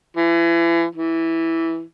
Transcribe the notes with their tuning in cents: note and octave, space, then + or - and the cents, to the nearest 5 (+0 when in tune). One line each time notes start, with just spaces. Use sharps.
E3 +35
E3 -5